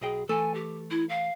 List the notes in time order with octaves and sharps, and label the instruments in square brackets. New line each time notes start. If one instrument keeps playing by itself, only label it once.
[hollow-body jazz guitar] B1 D#5 G5 [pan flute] G#4
[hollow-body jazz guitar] E3 A3 A4 [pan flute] G#5
[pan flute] G4
E4
F5